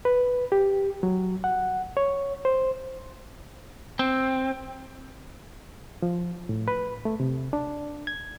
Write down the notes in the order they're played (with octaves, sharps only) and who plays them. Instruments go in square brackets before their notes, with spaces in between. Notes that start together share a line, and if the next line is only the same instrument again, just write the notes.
[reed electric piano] B4
G4
F#3
F#5
C#5
C5
[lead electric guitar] C4
[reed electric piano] F3
A2
B4
A3
C3
D4
G#6